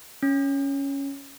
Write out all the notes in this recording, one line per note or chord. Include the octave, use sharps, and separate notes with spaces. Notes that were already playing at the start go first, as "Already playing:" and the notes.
C#4